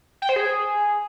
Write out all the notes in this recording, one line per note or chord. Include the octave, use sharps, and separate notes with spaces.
G5
C5
G#4